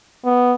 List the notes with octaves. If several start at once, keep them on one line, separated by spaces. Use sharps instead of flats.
B3